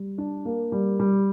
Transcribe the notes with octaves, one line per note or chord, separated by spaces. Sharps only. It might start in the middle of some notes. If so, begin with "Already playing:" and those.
Already playing: G3
D4
A#3
G3
G3